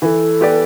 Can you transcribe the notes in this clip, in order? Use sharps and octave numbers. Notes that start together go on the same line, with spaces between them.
E3 A4 B4
B3 G4 D5